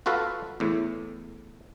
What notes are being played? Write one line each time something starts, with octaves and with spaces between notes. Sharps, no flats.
F4 F#4 A4 B4 F5
E2 A2